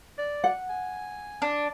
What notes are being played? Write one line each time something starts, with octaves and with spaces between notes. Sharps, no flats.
D5
F#5
G#5
D4